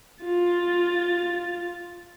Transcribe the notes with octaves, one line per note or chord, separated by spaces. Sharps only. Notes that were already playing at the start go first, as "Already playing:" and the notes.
F4 A6